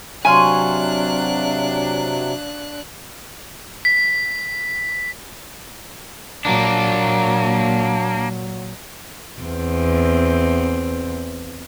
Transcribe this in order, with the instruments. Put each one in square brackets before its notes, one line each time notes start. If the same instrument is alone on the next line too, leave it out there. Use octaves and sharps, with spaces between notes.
[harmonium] C3 F#3 [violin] D4 F#6 [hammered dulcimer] C#5 F5 C6 [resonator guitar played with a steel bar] G#5
[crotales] B6
[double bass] A#2 F#3 [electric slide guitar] A#3 D4
[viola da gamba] E2 C4